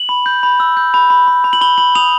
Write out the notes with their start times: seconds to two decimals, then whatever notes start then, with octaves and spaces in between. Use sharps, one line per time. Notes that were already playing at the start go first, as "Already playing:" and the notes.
Already playing: F#7
0.09 B5
0.26 G6
0.43 B5
0.60 E6
0.77 G6
0.94 B5
1.10 B5
1.28 B5
1.44 B5
1.53 F#7
1.61 B5 G7
1.78 B5 F#7
1.95 D#6 F7